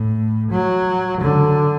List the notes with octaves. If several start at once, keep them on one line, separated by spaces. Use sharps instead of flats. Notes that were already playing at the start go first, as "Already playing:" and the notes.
Already playing: A2
F#3
D3